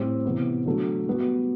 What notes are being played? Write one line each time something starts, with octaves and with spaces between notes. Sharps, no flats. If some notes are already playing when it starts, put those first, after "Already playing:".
Already playing: A2 G3 C4 G4
C3 E3 B3 E4
D3 F#3 A3
G3 B3 F#4